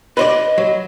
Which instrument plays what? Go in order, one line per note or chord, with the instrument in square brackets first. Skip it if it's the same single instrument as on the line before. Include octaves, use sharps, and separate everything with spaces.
[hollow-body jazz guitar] B4 C5 D5 [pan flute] D#5
[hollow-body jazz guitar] F#3